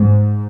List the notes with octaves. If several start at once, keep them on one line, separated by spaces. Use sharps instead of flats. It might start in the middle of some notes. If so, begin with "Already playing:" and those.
Already playing: G#2